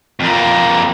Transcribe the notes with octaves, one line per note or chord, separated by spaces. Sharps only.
F2 A#3